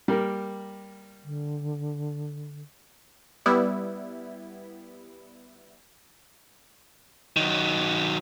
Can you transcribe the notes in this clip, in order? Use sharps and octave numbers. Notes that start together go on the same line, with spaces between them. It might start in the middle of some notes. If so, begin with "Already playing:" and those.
G3 A#3 A#4
D3
G3 B3 E4
D#3 F#3